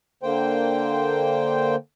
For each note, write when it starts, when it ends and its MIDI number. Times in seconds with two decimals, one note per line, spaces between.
0.23 1.76 50
0.23 1.76 58
0.23 1.76 72
0.23 1.76 79